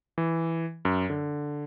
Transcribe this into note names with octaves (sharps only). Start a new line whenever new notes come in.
E3
F#2
D3